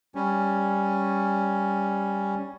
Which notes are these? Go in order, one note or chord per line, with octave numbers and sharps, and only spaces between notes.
G3 C#4